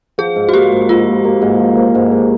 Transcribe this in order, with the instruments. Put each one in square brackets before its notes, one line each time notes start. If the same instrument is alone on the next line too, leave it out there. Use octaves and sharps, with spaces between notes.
[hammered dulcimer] F3 [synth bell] G#4
[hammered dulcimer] G#2
[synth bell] F#4
[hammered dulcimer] A#3 [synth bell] G4
[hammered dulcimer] G#2
[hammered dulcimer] G#2 [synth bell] F4
[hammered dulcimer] A#3
A#3
G#2
F3
A#3
G#2
G#2